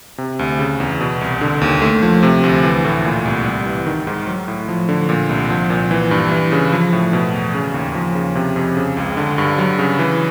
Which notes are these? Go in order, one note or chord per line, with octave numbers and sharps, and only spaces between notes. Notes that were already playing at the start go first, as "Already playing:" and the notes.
C3
D2
C#3
E2
B2
C2
D3
D#2
A3
F3
C3
D2
E3
A2
A#2
C2
G3
E3
D#3
G#2
F#3
A2
F3
D3
A#2
C2
F3
A#2
E3
G2
E3
C#3
F3
A2
B2
E2
C#3
D#2
F3
C#3
C3
F2
C#3
C#2
D3
G2
F#3
C#3
E3